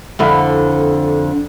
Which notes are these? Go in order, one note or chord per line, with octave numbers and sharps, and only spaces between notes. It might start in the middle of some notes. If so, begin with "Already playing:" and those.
F2 D3 E4